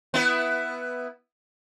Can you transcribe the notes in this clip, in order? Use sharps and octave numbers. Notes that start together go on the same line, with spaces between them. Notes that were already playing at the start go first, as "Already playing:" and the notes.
B3 E4 B4